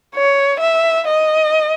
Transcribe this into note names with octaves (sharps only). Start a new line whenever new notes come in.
C#5
E5
D#5